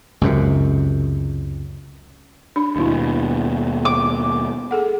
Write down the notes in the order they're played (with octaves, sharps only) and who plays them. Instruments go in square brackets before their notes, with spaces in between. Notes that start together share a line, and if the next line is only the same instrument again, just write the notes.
[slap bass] C#2 F#2 C3
[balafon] D4 B5
[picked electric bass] D#2 B2 [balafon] D4 E4
[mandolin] D6
[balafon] G#4 A4 F#5